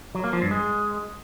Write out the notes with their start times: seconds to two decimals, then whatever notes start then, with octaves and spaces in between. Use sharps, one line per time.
0.15 F#3
0.24 A#3
0.33 F3
0.42 G2
0.51 G#3